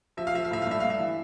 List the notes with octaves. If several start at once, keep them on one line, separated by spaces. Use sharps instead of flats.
F3 E5
F5
F3 E5
F5
A2 E5
F5
G2 E5
G2 F5
E5
E3